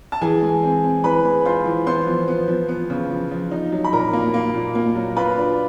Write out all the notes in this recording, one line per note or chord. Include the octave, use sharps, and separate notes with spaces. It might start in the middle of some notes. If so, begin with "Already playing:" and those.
A5
E3 G#4 G#5
G#3
C4
C4
E3 B4 B5
G#3
F4 C5 C6
E3
B3 C5 C6
F3
B3
F3
B3
C#3
F3
F3
D#4
F#3
B5
A#2 A#4 A#5
A#3
A#3
A#2
A#3
F#3
F4 B4 B5
D4